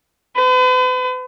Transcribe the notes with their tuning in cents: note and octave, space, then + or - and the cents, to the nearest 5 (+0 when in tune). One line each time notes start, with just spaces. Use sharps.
B4 +45